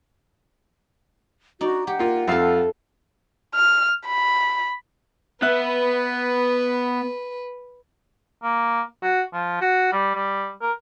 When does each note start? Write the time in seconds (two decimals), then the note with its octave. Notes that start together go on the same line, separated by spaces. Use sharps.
1.61 D#4 F#4 D5
1.87 G4 F#5
1.99 A#3 F4
2.27 F2 F4 A4 E5 F5
3.55 F6
4.06 B5
5.42 B3 B4 E5 F#6
8.43 A#3
9.02 F#4
9.33 F3
9.61 F#4
9.92 G3
10.15 G3
10.61 A#4